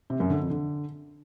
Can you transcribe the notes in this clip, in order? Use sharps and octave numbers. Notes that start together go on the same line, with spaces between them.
C3
F#2
D3
F2
D3